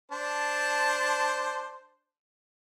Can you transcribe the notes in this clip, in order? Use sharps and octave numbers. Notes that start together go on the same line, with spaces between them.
D4 C5 A5